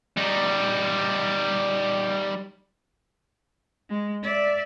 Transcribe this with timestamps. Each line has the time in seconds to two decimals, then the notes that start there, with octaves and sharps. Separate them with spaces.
0.17 G3 D#4
3.90 G#3
4.23 D5 E5